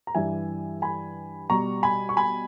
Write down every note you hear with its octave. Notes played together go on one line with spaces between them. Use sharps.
A#5
G2 E3 G3 E5 G#5
G#5 B5
B2 G3 A#5 C#6
G#5 B5
C#6
G#5 B5